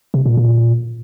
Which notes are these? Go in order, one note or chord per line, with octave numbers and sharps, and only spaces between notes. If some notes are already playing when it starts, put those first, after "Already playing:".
C3
A#2
A#2